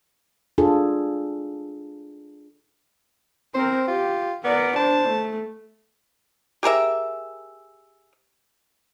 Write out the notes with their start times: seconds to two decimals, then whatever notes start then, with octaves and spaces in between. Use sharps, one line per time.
0.58 D4 F4 G#4 A4
3.55 C4 A#4 C5
3.88 F4 G4
4.44 B3 A#4 D5
4.76 D4 C5 A5
5.07 A3
6.63 G4 G#4 A#4 E5